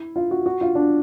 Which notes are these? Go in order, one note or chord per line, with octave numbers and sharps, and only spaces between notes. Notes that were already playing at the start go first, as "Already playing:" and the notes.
Already playing: E4
F4
F#4
F#4
F4
D4